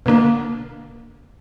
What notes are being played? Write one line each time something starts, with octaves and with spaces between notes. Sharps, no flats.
B2 D3 A#3 D4